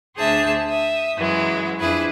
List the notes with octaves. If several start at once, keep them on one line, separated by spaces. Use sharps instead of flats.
D2 D4 G#4 C5 E5 A5
E5 D#6
F#2 E3 F#3 G#3
F2 D4 E4 G#4 B4